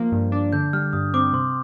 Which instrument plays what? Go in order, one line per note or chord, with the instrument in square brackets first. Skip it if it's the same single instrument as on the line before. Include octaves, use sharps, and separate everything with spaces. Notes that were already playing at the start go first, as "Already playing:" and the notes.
Already playing: [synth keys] F3 A#3
G2
D4
[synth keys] D3 [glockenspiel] G6
[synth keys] G3 [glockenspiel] F6
[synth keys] G2 [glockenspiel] D#6
[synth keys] C4 [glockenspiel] D6
[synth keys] C3 [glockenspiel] C6